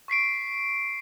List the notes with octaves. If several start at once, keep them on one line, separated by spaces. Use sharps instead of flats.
C#6 B6 C7 D7